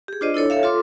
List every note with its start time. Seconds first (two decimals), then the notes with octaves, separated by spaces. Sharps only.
0.08 G4 G#4
0.21 D4 F4 C5 D5 D#5
0.34 D4 E4 A4 C#5
0.50 A4 C#5 E5 F5
0.63 F4 A4 C6 D6